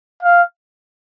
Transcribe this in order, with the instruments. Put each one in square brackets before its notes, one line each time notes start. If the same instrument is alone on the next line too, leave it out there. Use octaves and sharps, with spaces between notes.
[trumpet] F5